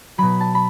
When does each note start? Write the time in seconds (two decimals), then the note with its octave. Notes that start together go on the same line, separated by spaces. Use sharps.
0.18 B2 F#3 B5
0.40 A5
0.55 B5